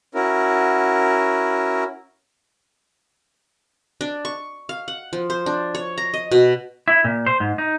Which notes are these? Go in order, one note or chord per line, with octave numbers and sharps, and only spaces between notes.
C#4 E4 F#4 A#4
D4
C#6
F5
F#5
F3
C5
D4
C#5
A#5
D#5
B2
E4
A#2
C5
G#2
D#4